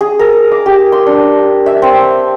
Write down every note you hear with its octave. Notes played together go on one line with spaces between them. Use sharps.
G#4
A#4
D6
G4
C6
D4
E5
C4